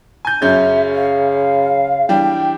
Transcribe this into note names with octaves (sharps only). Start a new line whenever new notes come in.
G#5 G6
F#2 C#3 C#4 E5 G6
F5
E3 G3 D4 G5